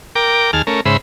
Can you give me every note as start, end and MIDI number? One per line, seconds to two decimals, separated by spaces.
0.15 0.51 70
0.15 0.51 79
0.15 0.51 86
0.53 0.62 39
0.53 0.62 68
0.53 0.62 81
0.53 0.62 89
0.67 0.81 57
0.67 0.81 61
0.67 0.81 70
0.86 0.97 44
0.86 0.97 49
0.86 0.97 72
0.86 0.97 76
0.86 0.97 83